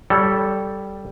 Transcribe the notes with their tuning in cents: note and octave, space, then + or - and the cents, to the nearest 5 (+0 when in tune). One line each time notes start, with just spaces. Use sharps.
G3 -5 A4 +0 C#5 +25